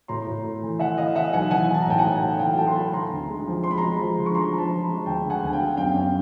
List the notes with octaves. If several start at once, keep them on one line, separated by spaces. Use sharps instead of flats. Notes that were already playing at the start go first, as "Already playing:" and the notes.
A2 A#5 C6
A2
A3
E3
E3 E5 F#5
E3 D#5 F5
E3 E5 F#5
B1 F#5 G#5
E3 F#5 G#5
E3 A5
A#5
A2 G5 A5
F#5 G#5
A2
G#5
A3 G5 A5
E3 F5 G5
A3 G5 A5
C6
A3 A5 B5
D3 A#5 C6
D2
G#3
F3
G#3 C6
B5
G#3 A#5 C6
F3
D3
C#6
F3 A#5 C6
F3 A#5
A5 B5
F3
G#3
D2 G5 A5
D3
F#5 G#5
D2 G#5
F5 G5
D3
F#2 F5 G5
F#2